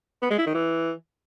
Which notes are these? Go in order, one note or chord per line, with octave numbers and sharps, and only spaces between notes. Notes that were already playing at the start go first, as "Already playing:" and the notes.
B3
G#3
E4
D#3
E3